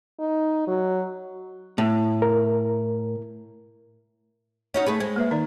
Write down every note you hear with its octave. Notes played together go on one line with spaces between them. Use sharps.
D#4
F#3
A2
A#4
C#4 D#4 F#4
A3 G#4 B4
G#3 C5
A#3 B4 E5
D#3 D#4 D5